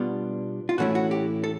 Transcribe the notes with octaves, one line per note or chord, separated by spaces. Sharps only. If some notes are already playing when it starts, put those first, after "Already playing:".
Already playing: B2 G3 B3 D4 F4
F4
A2 E3 A3 C#4 E4 F#4
F#4
G4
A4